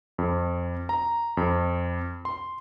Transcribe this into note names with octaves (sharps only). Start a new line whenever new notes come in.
F2
A#5
F2
C6